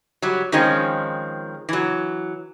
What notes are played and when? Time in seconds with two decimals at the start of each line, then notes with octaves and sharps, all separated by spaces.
0.22 F#3 G3
0.52 D#3 F3 G#3 C4 C#4
1.69 E3 F#3